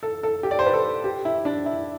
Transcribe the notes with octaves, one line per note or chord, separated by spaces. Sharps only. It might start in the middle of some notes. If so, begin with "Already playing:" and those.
A4
A4
G4
D5
C5
B4
A4
G4
E4
D4
E4